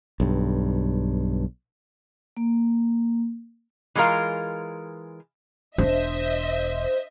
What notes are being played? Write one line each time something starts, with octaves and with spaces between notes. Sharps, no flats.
B1 G2
A#3
E3 G#3 F4 A#4 F5
E1 D4 C5 D#5 E5